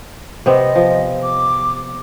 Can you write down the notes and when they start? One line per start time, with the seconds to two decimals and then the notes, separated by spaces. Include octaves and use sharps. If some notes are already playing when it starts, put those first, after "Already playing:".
0.46 C3 B3 C4 D#5
0.76 F3
1.22 D6